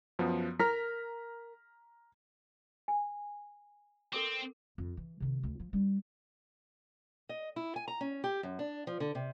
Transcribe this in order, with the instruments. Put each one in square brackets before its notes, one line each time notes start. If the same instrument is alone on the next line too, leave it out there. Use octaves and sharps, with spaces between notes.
[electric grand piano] F#2 F3 B3
[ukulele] A#4 [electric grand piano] A#5 F6 B6
[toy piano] G#5
[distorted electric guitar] C4 [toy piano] A4 A#4 D6
[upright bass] F2
E3
C3 D#3
D2
F3
G3 D4
[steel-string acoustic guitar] D#5
E4
G#5
A#5
C#4
G4
F#2
D4
F3
D3
C3